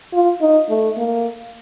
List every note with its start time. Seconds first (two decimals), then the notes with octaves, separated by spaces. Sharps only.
0.13 F4
0.41 D#4
0.70 A3
0.97 A#3